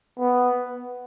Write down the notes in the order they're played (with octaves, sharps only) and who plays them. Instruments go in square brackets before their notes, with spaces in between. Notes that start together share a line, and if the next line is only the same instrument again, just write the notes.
[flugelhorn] B3